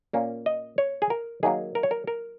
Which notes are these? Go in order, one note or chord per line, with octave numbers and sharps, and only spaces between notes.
A#2 A#3 C#4
D#5
C#5
G#4
A#4
D#3 F#3 A#3 D#4 G#4
A#4
C#5
A#4
A#4